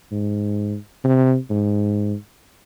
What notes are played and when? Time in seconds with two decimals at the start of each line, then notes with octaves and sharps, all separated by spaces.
0.12 G#2
1.04 C3
1.50 G#2